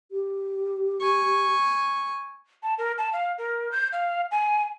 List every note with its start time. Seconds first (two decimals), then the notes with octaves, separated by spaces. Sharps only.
0.12 G4
1.00 G#5 C#6
2.63 A5
2.78 A#4
2.98 A5
3.13 F5
3.38 A#4
3.72 G6
3.92 F5
4.31 G#5